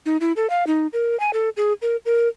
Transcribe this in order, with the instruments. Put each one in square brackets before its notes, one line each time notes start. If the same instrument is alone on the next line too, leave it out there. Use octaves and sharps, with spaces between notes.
[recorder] D#4
E4
A4
F5
D#4
A#4
G#5
A4
G#4
A#4
A#4